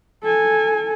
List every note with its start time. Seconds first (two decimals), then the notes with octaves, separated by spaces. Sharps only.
0.23 A4 G#5